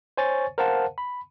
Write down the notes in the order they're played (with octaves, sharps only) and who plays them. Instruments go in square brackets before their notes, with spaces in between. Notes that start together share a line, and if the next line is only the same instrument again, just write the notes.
[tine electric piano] C5 C#5 G#5 C#6 A6
A#4 C5 F5 F#5 A5
B5